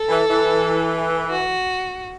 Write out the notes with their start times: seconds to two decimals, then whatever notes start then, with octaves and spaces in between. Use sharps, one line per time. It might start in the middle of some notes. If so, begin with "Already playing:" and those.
Already playing: A4
0.09 E3
0.30 E3
1.30 F#4